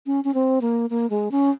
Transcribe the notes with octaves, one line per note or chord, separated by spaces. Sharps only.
C#4
C#4
C4
A#3
A#3
G#3
C#4